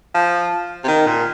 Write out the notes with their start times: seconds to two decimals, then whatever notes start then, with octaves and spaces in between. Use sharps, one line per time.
0.14 F3
0.84 C3
0.88 D#3
1.06 A#2